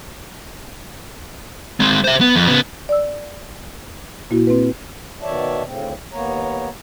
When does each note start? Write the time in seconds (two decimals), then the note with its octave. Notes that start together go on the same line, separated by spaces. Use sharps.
1.80 G#3 C4
2.04 C5 E5
2.21 B3
2.36 F2
2.47 C#3 B3
2.89 D5 E6
4.30 A#2 A#3 E4 F#4
4.47 C4 B4
5.22 B2 D#3 C#5 D5 E5 A5
5.65 D2 A2 C#3 C4
6.13 D#2 A#3 B3 C#5 A#5